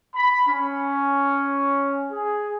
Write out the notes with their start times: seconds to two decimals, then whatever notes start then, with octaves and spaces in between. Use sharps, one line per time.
0.15 B5
0.47 C#4
2.12 G#4